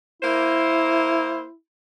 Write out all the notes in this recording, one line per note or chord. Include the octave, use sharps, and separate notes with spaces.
A#3 E4 C5